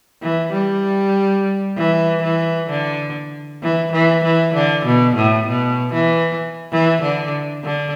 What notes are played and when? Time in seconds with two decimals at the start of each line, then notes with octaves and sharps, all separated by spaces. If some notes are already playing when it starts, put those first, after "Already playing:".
0.22 E3
0.53 G3
1.77 E3
2.23 E3
2.70 D3
3.62 E3
3.92 E3
4.24 E3
4.54 D3
4.86 B2
5.16 A2
5.48 B2
5.93 E3
6.72 E3
7.02 D3
7.64 D3